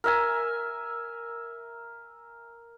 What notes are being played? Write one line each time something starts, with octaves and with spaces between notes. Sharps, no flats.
A#4 E5 G#5